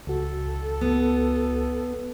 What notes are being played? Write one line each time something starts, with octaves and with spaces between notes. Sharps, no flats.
C#2 F#4 A4
B3